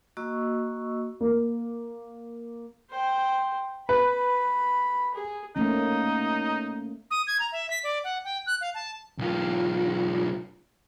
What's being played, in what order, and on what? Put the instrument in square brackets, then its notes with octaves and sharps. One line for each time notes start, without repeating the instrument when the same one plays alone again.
[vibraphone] A#3 F#4 D#5 C#6 E6
[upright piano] A#3
[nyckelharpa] C5 G5
[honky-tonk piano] B4 [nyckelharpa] B5
[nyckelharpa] G#4
[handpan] A3 A#3 C#4 [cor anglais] D#4
[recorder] D#6
G#6
A#5
E5
B6
D5
F#5
G5
F#6
F5
A5
[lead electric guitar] B1 F4